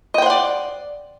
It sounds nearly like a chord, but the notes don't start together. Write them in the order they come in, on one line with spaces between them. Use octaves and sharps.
D#5 G5 C5 F#5 D5